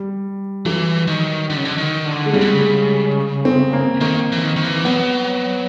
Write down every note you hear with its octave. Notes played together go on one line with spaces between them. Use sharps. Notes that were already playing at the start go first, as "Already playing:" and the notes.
Already playing: G3
E3 F#3
D#3
D3
C#3
D3
D#3
D3
G#3
C#3 G3
D3
C#3
G#3
C4
A#3
D#3 A#3
E3
D#3
D#3
E3
F#3 B3